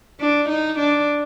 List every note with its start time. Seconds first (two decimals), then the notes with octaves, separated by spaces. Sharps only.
0.21 D4
0.49 D#4
0.79 D4